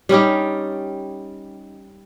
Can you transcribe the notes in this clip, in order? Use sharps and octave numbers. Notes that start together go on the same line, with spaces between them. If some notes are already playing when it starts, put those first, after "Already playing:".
G3 C#4 D#4 G4